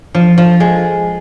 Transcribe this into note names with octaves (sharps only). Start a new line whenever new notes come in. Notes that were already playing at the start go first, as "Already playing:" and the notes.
F3
F3
G#3